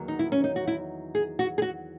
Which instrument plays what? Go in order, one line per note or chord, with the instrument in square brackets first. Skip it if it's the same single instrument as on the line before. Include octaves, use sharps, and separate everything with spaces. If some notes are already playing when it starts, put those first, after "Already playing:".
Already playing: [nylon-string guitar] E2 D#3 F#3 A#3
D#4
E4
C#4
D#4
F#4
E4
G#4
F#4
G#4
F#4